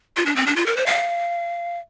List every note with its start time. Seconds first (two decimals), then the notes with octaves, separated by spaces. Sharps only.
0.17 F4
0.26 D4
0.36 C4
0.47 D4
0.56 F4
0.66 A#4
0.77 C5
0.86 F5